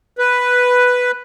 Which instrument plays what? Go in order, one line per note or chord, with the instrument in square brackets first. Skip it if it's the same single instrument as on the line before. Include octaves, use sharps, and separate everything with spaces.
[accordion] B4